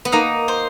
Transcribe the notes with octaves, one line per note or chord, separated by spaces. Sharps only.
B3
A#3 D#4
C5